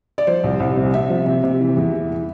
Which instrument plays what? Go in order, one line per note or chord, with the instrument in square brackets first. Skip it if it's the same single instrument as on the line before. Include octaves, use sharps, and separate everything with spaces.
[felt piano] D5
F3 C5
C2
C2
C3
C3 E5
F3
C3
C3
E3
E2
E3
E3